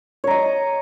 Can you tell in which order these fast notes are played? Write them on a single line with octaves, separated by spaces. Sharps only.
C#5 A#5 D#5